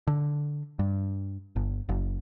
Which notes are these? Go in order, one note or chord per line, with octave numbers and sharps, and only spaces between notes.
D3
G2
G1
F#1